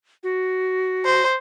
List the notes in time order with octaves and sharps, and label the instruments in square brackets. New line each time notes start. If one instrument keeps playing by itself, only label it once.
[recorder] F#4
[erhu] C5